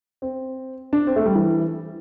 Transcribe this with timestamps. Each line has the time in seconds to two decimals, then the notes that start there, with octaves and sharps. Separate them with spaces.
0.22 C4
0.93 D4
1.07 C4
1.16 A3
1.25 G3
1.35 E3